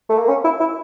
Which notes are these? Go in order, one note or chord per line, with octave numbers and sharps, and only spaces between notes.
A3
A#3
C#4
E4
E4